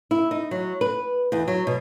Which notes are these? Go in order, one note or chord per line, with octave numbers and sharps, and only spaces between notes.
E4
D#4
F#3
B4
E2
F#3
B2